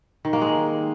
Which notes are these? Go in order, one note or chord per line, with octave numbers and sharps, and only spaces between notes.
D#3
A#3
G#3